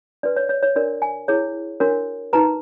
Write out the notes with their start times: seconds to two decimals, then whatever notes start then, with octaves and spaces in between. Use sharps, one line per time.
0.23 D4 F#4 B4 D5
0.36 C#5
0.49 C#5
0.63 C#5
0.75 D4 F#4 A#4 C#5 D5
1.02 G#5
1.28 E4 G#4 C#5
1.80 D4 F#4 A#4 C#5
2.33 D#4 F#4 B4 A#5